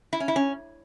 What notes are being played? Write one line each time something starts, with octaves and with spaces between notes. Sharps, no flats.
E4
C#4
E4
C#4